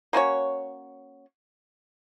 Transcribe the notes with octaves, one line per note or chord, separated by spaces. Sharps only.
A#3 C#4 F#4 C#5